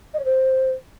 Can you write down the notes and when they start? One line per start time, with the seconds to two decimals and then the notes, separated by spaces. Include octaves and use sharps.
0.14 D#5
0.19 C#5
0.25 C5